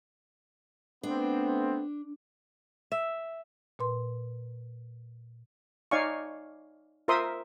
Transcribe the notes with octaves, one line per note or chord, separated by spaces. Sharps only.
A3 B3 C4 D4
E5
A#2 B4 C6
D#4 C#5 D5 F5 G#5 C#6
F4 A#4 C5 E5 C6 D#6